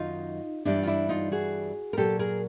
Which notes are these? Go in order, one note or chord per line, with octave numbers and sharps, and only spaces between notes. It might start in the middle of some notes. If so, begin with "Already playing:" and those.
Already playing: F#2 D#3 F#3 D#4 F4
G2 E3 G3 D4 E4
F4
D4 E4
D#4 F4
F#4 G#4
A#4
A#2 F#3 G4 A4
G#4 A#4